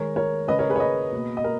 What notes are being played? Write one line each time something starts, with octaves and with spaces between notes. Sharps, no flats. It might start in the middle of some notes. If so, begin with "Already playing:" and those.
Already playing: D#3 G#3 A#4 C#5
A#4 C#5
C#3 G#3 B4 D#5
A#4 C#5
G#4 B4
C#5
B4 D#5
B2 A#3
D#5
A#4